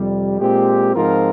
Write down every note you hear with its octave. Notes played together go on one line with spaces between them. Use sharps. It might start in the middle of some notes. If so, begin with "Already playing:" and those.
Already playing: F2 C3 G3
A#2 G#3 C4 G4
G#2 F3 C4 F4 A#4